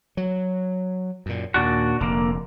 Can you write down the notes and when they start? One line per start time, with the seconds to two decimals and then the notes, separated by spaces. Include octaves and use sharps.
0.17 F#3
1.26 F#2 A#2
1.54 D#2 A#2 D4 F#4
2.01 F1 D3 A#3